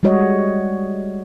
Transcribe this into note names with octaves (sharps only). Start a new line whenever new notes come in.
G3 G#3 F#4 C#5 D#5